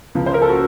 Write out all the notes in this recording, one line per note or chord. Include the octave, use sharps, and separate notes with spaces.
C#2 C#3 F3
C5
A#4
A4
F#4